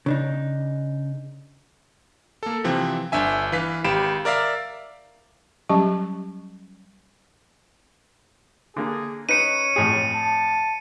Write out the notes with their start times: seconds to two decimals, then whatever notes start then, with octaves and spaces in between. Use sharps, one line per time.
0.06 C#3 D4 D#4
2.43 A#3 A4
2.64 C3 E3 F3 C4
3.12 G1 D4 E5 G#5
3.52 E3 B4 F5 B6
3.84 G#1 G4 F5 B5 D7 E7
4.25 A#4 D5 E5 F5
5.69 F#3 G3 C#4 G4 A5 C#6
8.77 D3 A#3 G#4
9.29 C#4 D#4 B4 C#7 D#7
9.76 F2 A2 G#4
10.15 A5